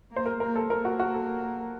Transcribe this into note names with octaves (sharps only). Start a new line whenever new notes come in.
A#3
C5
A#4
A#3 A#4
A4
A#3 A#4
F#4
F#4
A4